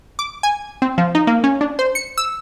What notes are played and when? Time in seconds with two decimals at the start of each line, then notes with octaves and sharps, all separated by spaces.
0.19 D6
0.43 G#5
0.82 C4
0.98 F3
1.15 D#4
1.27 A#3
1.44 C#4
1.61 D4
1.79 C5
1.95 C#7
2.18 E6